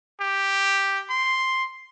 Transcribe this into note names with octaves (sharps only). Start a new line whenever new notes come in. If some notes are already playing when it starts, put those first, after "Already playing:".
G4
C6